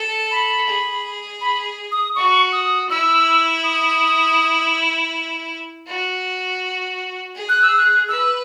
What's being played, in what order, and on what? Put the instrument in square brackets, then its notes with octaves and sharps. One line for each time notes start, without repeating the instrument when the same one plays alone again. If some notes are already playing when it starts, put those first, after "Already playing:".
Already playing: [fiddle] A4
[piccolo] B5
[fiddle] G#4
[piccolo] B5
D#6
[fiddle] F#4 [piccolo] C#6
[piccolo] D#6
[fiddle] E4 [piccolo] E6
[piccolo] D#6
[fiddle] F#4
G#4
[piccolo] F#6
E6
F#6
[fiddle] B4 [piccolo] E6